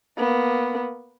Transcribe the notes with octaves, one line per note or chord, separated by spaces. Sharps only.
A#3 B3